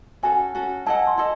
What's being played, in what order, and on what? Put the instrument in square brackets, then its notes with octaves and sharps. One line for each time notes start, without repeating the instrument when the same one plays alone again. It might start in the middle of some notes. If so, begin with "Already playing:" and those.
[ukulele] C#4 F#4 A4 [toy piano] G#5
[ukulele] C#4 F#4 A4
[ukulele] E4 A4 D#5 F#5 [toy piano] A5
[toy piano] G#5
C6
[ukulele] E4 A4 D#5 [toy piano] A5